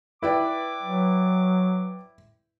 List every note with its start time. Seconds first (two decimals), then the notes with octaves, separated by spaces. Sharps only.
0.23 E4 B4 D5 G5 D6
0.83 F#3